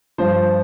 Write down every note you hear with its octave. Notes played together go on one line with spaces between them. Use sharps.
G2 F3 C5